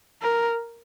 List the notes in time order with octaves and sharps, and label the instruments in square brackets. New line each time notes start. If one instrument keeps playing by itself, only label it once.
[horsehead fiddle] A#4